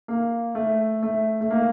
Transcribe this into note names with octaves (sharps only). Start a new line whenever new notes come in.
A#3
A3
A3
A3
A#3